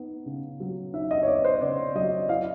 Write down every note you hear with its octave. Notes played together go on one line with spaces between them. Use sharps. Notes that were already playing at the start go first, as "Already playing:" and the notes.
Already playing: B3 D#4
C#3
F#3
D#4 E5
D#5
C#5
B3 D5
C5
C#3 D5
F#3 D#5
E4 F5